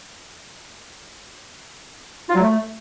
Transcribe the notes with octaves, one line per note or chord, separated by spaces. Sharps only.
F4
F#3
A3